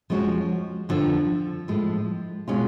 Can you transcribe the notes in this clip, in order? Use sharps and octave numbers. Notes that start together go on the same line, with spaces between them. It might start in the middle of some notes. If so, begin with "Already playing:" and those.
F2 F3 G#3 C#4 F#4
F2 D3 F3
A2 F3 G#3
B2 G#3 C#4 F4